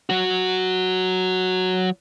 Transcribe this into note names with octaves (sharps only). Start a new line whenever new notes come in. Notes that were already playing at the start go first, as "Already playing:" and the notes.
F#3 F#4